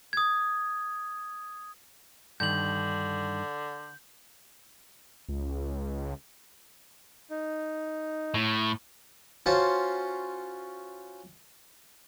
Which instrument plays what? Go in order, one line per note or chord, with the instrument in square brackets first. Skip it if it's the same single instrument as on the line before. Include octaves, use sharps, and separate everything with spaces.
[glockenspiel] D#6 G#6
[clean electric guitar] G2 D#3 [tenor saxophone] D3 [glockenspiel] G6 F#7
[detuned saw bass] C#2
[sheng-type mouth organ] D#4
[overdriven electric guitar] A2
[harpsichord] C#4 F4 F#4 C5 A5